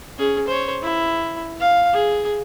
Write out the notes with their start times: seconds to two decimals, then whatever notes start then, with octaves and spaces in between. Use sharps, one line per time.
0.18 C#4 G#4
0.48 C5 C#5
0.82 E4
1.61 F5
1.93 G#4